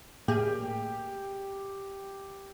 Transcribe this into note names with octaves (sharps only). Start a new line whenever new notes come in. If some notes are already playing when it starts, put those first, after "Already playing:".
A2 A#3 G4 G#4